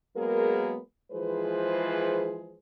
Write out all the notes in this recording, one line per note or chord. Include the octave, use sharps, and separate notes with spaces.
F#3 G#3 A#3 B3 G#4 A#4
E3 F3 G#3 G#4 B4 C5